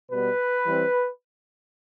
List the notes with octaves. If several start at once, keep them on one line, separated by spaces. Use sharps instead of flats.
B2 G3 B3 B4
E3 G3 C4